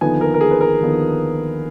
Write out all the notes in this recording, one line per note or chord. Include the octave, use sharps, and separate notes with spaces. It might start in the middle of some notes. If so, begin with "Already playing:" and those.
D#2 D3 F3 B3 D#4 G#5
A#4
A#4
G#4
B4
A#4
D#2 D3 F3 B3 D#4